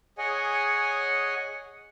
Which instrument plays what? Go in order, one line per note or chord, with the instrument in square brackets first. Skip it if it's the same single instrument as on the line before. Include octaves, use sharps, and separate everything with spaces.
[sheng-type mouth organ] G#4 C#5 D#5 F#5 G#5